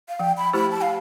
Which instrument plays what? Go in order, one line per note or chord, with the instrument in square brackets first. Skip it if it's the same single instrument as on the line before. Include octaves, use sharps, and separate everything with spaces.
[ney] F5
[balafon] F3 [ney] G5
[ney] B5
[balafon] A3 E4 G4 C5 [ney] B5
[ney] A5
F5